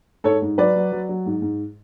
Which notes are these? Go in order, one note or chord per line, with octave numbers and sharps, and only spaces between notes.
G#2 A4 C#5
G#2
F#3 B4 D5
F#3
F#3
F#3
G#2
G#2